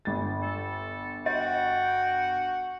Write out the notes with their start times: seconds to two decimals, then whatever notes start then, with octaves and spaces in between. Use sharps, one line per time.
0.05 G1 A6
0.42 A4
1.26 F#4 D#5 G5